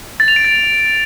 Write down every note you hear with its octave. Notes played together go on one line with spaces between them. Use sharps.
A6
F7
D7
A6